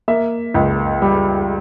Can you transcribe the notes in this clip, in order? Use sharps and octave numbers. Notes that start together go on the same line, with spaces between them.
A#3 E5
C#2
G3